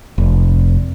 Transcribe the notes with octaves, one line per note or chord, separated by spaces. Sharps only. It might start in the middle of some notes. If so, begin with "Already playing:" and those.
F1